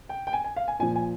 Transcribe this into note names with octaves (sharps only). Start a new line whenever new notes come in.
G5
G5
G#5
G#5
F5
G#5
A#2 F3 G#5
G#5